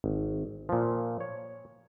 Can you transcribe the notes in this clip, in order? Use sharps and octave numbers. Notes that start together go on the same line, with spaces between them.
G#1
A#2 F3
C#5